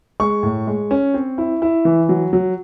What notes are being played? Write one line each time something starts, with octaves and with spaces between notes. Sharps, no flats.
G#3 C#6
A2
G#3
C#4
C4
E4
E4
E3
F#3
F#3